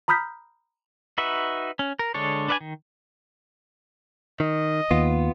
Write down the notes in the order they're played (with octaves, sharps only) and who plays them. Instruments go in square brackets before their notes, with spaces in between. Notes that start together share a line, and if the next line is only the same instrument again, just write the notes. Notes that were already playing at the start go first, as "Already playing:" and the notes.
[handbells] A#5 B5 D#6 F6 G6 B6
[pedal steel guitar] D#4 F#4 B4 E5
C#4
A#4
D3 G#3 D4 A4 C#5
D4 B4 D5 F5 G#5
D#3
[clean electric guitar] D#3 [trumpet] D#5
[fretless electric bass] D#2 [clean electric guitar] B3 F4